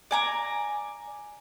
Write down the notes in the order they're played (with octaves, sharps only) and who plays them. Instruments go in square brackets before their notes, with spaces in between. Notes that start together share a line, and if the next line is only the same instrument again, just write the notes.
[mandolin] D5 G#5 A#5